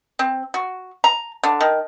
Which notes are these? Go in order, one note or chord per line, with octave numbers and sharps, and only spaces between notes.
C4
F#4
A#5
D3
D#3